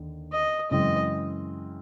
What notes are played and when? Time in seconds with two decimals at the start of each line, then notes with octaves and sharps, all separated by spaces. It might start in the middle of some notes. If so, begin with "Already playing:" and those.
Already playing: D#2 D3
0.32 D#5
0.71 F#2 C#3 E3 G#3 C4 D#5